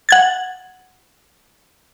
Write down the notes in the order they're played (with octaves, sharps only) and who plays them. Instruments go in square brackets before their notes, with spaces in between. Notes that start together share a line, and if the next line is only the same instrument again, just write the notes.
[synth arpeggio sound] F#5 G#6 A6